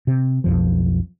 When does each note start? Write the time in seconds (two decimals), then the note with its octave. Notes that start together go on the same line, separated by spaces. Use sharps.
0.07 C3
0.44 B1 F2 F3